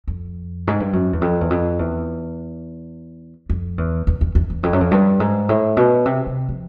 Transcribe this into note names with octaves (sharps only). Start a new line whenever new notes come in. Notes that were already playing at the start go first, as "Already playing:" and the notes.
F2
G#2
G2
F#2
E2
F2
E2
F2
E2
F2
E2
E2
E2
E2
E2
F2
F#2
F2
G2
G#2
A2
B2
C3
C3
F3